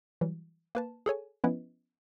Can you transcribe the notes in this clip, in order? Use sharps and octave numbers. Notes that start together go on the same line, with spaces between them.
E3 F#3 G3
A#3 B4 A5
G#4 A4 C#5 G#5
F3 B3 C#4 E4 B4 D#5